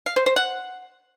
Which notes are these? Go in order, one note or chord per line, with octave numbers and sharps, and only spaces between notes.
F5
C5
C5
F#5